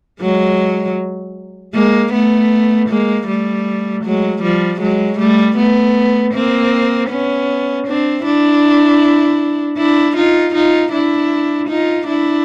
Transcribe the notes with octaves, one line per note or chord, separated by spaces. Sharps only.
F#3 G#3
G#3 A#3
A3 B3
G#3 A#3
G3 A3
F#3 G#3
F3 G3
F#3 G#3
G3 A3
A3 B3
A#3 C4
B3 C#4
C4 D4
D4 E4
D4 E4
D#4 F4
D#4 F4
D4 E4
D#4 F4
D4 E4